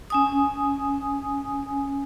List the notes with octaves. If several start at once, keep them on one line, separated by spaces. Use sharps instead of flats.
C#4 G#5 D#6